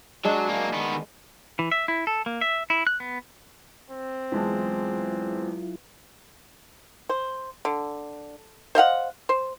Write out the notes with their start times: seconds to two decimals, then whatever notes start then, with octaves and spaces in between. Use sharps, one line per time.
0.25 F#3 G#3 D4 G#4
0.49 F#3 A#3
0.74 D#3 B3
1.59 E3
1.71 E5
1.88 E4
2.07 A4
2.26 A#3
2.41 E5
2.70 E4
2.87 F#6
3.00 B3
3.90 C4
4.32 E2 F#3 G#3 E4 F4 A5
7.09 C5
7.65 D3
8.75 C5 D#5 F5 F#5
9.29 C5